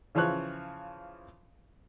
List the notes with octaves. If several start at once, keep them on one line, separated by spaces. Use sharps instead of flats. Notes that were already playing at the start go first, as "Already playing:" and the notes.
C#3 E3 F3 C5 C#5 F#6